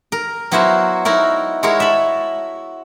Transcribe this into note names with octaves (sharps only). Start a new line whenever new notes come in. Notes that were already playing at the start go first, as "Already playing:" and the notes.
A#4
F#3 B3 E4 F#4 A#4 C5
D#4 E4 F#4 A#4
G#3 E4 F#4 G#4 A#4 C#5
E5 A5 B5